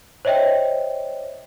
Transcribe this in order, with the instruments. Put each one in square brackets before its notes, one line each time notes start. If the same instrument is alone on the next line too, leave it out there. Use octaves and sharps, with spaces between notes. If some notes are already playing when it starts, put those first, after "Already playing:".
[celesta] C5 C#5 D#5 E5 G5